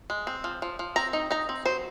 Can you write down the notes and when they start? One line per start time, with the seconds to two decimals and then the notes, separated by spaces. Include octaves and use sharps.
0.10 G#3
0.27 C4
0.44 F3
0.62 F3
0.79 F3
0.96 C4 A#5
1.13 D#4
1.31 D#4 A#5
1.49 C4
1.66 F#3 C5